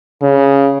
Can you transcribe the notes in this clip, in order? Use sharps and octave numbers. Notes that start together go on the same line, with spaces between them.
C#3